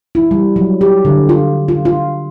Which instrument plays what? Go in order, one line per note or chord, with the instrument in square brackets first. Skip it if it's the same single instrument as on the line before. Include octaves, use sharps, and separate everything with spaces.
[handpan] E4
G3
F#3
G4
D3
F4
F4
F4